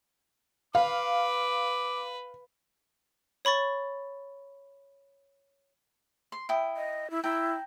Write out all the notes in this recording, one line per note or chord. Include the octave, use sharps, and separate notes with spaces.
B4 F5 D6
C#5 B5 C#6 A6
C6
E4 G5 D#6
D#5
E4
E4 G5 A#5